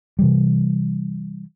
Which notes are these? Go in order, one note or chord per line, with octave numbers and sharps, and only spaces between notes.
C3 E3 G3